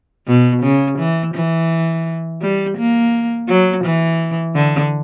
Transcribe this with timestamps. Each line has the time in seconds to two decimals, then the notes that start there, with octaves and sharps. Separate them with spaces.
0.28 B2
0.63 C#3
0.99 E3
1.35 E3
2.42 G3
2.78 A#3
3.49 F#3
3.85 E3
4.55 D3